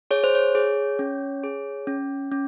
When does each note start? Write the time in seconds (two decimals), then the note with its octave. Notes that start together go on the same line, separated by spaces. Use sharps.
0.11 G#4 C#5
0.24 C5
0.35 C#5
0.55 G#4
0.99 C#4
1.44 G#4
1.87 C#4
2.32 C#4